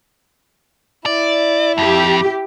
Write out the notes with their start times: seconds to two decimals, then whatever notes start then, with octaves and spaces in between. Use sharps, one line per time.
1.06 E4 D5
1.78 F2 G4